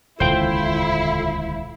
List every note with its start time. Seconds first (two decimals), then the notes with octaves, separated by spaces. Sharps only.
0.20 D#1 C#2 A#2 D3 E4 C5 F5 G5